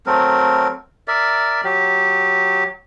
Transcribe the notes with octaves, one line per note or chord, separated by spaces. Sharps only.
F#3 A3 C4 A#4
A#4 D5 E5
F#3 G4